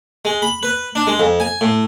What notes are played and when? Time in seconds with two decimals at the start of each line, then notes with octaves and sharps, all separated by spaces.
0.25 G#3
0.42 B5
0.63 B4
0.95 D4
1.07 G#3
1.20 F2
1.40 G#5
1.61 A2